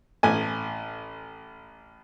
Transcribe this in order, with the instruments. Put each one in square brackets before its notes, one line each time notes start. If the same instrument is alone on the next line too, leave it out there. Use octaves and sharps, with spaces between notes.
[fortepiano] A1 G#5